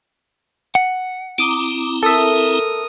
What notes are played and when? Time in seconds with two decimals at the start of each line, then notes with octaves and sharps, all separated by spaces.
0.75 F#5
1.38 C4 E4 A#5 D6 D#6
2.03 A4 A#4 E5 D#6